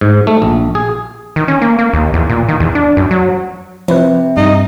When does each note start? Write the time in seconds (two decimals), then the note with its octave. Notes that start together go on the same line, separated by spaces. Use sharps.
0.01 G#2
0.27 A3
0.42 A#1
0.75 G#4
1.36 D#3
1.48 C#4
1.62 A#3
1.79 A#3
1.93 D#2
2.14 E2
2.29 A#2
2.49 D#3
2.60 E2
2.75 D4
2.97 F#2
3.11 F#3
3.88 C3 F3 E4 B4
4.37 G2 D#4